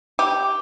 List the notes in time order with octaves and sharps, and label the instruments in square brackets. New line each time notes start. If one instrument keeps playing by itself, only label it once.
[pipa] G4